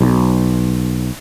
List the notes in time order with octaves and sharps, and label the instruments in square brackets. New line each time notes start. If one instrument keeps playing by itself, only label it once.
[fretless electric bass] B1